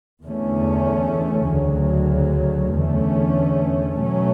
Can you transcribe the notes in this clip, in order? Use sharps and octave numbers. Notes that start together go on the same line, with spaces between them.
E2 D3 A3 C#4
D2 C#3 F#3
E2 D3 A3 C#4
B2 F#3 A3 C#4